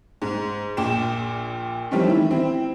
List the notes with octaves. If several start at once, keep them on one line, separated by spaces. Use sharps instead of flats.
G#2
A#1 A#2 G5 E7
E3 F3 G3 A3 C4 C#4
D#3 E3 E4
C4 E4